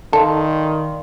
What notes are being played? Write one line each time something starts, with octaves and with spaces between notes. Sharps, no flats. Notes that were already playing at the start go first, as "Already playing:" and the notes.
D#3 A4 D5 F5 C6